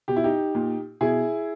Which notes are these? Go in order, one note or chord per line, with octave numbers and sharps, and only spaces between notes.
B2 G4
E4
D#4 G4
A#2
B2 E4 G#4